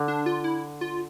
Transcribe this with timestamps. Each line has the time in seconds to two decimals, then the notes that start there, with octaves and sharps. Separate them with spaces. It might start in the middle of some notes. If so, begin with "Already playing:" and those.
Already playing: D3
0.08 D4
0.26 F4
0.44 E4
0.81 F4